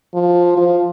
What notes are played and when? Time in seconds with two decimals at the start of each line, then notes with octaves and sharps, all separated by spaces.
0.14 F3
0.57 F3